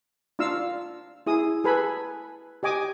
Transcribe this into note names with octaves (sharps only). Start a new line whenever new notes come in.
D4 F4 F5 E6
E4 G#4 D#6
G#4 A4 B4 G#5 B5
G4 D#5 G#5 D6 D#6